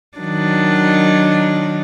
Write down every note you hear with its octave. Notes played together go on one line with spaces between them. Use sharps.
D#3 F#3 D4